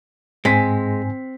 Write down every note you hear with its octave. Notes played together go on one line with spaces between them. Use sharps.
G#2 G#3 C4 G#5 B6